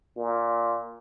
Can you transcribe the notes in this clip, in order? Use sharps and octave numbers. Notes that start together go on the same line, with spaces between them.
A#2